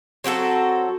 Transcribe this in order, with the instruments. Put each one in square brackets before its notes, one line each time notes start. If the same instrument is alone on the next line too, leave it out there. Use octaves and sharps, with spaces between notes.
[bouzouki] F#3 C4 F#4 A4